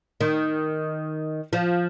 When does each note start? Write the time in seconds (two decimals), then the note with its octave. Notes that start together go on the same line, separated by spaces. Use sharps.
0.21 D#3
1.53 F3